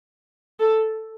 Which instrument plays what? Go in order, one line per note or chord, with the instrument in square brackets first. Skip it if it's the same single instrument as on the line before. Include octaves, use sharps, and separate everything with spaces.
[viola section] A4